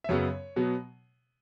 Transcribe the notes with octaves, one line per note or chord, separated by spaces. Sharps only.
E5
F#2 C#3 F#3 B3 C#5
B2 F#3 B3